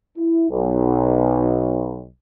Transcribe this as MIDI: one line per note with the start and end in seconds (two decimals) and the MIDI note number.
0.17 0.47 64
0.50 2.04 35